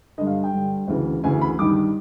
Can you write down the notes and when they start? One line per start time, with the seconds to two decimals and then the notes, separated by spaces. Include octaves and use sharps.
0.18 D3 D#5
0.21 G2
0.27 F5
0.44 G5
0.53 G2 D3
0.88 D2 C#3 E3
1.24 D2 C#3 E3 G#5
1.41 B5
1.59 G2 D#3 D6